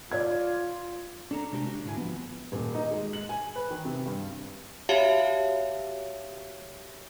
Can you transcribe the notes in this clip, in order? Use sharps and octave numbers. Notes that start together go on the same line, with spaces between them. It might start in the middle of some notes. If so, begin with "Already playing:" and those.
F4 D5 G#6
D4 A4 A#5
C3 G#3 D4 F#4 G4 C5
D4 F#4 G4
G#2 D3 E4 G#4 G#5
F3 B3
D#1
D#4
G#3
F#7
G#5
B4
D#3
C3
G2
F#4 G4 C#5 E5 F5 A5